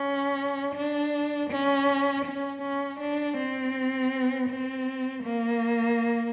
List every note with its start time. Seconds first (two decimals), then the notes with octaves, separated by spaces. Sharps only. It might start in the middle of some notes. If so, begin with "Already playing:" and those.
Already playing: C#4
0.75 D4
1.51 C#4
2.25 C#4
2.62 C#4
3.00 D4
3.38 C4
4.49 C4
5.24 A#3